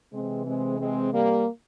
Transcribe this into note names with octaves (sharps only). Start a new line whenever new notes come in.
C3 E3 G#3 C4
G#3 C4
G#3 C4
G3 A#3